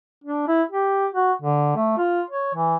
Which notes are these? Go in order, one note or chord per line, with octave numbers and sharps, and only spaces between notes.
D4
E4
G4
F#4
D3
A3
F4
C#5
E3